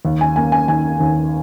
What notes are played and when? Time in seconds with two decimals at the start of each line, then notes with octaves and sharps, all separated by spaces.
0.05 D#2
0.21 G#5
0.36 A#3 G#5
0.52 G#5
0.68 D#3 G#5
1.00 D#2